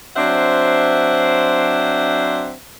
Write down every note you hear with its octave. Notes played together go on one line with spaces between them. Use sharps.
F#3 C4 D4 C5 E5 F#5